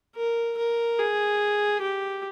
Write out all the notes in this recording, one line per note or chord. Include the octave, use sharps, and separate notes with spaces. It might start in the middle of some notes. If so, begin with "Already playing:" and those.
A#4
A#4
G#4
G4